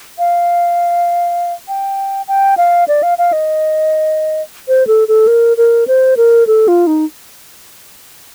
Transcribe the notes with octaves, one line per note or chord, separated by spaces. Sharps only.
F5
G5
G5
F5
D5
F5
F5
D#5
C5
A4
A4
A#4
A#4
C5
A#4
A4
F4
D#4